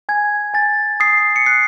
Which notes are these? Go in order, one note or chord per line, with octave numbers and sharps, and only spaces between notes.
G#5 G#6
G#5 A6
D#6 C7
C#7
F#6 C7